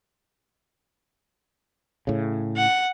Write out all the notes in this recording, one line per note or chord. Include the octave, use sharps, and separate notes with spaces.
A2 C#3
F#5